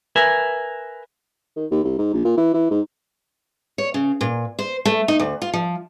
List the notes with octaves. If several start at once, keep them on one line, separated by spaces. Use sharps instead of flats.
A#4 B4 E5 G#5
D#3
D#2
C2
G#2
A#1
A#2
E3
E3
G#2
C#5
C#3
A#2
C5
A3
D#4
D2
F4
F3